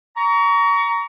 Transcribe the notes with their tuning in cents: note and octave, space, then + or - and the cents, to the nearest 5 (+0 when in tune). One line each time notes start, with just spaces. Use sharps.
A#5 +0 C#6 +30